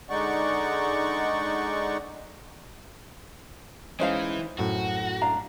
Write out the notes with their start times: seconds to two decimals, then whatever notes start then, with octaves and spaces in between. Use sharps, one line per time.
0.10 D3 G#3 D#4 D5 F#5 C#6
4.00 E3 G#3 C#4 D#4 C5 F5
4.58 F#2 A2 F#4
5.21 D4 F5 A#5